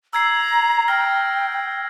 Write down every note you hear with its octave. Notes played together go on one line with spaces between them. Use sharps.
A#5 E6 G#6 C7
G5 F6 A#6